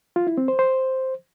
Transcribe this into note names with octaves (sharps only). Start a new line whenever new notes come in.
F4
E4
C4
C5
C5